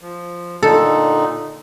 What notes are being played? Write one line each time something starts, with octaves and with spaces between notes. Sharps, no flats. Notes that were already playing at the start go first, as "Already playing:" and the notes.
F3
A#2 D3 D#4 A4